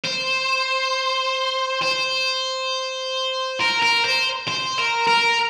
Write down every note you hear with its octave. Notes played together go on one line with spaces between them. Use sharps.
C5
C5
A#4
A#4
C5
C5
A#4
A#4